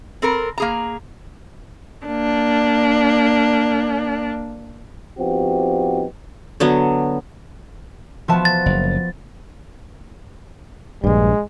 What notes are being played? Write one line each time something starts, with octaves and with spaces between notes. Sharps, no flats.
C4 A4 A#4
A#3 G#4 A#5
A#3 D4
F3 B3 C4 D#4 F#4 G4
D3 F#3 B3
F3 B3 F#4 E5 A5
A6
F#1
A#1 G2 G#3